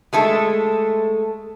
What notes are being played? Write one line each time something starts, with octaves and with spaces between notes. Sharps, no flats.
G#3 A3 A4